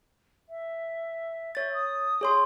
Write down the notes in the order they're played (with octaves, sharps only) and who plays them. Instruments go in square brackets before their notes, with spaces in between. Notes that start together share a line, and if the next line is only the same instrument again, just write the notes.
[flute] E5
[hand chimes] C#5 A6 [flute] E5
[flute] D#6
[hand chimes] G#4 C#5 C6